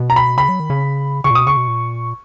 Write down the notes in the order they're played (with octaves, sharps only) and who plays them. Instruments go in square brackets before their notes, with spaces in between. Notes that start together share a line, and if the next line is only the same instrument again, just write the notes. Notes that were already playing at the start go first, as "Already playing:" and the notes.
Already playing: [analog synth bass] B2
[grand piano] A#5
B5
[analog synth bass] C#3 [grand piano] B5
[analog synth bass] F#3
D#3
C#3
[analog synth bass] C#3 [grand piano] C#6
[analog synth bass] A#2
[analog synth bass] B2 [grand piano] D#6
[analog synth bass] C#3 [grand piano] C#6
[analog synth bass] B2
A#2